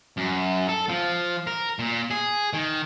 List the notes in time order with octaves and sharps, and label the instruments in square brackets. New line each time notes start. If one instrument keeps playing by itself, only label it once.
[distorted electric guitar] F#2
A4
F3
A#4
A#2
G#4
D#3